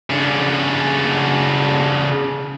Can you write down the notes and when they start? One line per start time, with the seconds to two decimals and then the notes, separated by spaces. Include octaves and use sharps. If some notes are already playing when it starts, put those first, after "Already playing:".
0.10 C#3 D4